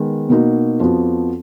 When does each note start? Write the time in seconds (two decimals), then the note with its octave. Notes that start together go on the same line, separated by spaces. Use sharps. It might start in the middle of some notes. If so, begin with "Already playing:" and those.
Already playing: D#3 G#3 B3
0.29 B2 A#3 D#4 F#4
0.80 F2 F3 B3 F#4